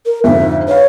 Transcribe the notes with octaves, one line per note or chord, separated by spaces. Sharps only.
A#4
F2 G#2 D3 E5
B4 C#5 F5